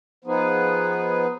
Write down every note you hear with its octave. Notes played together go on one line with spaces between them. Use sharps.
F3 B3 D#4 G#4 B4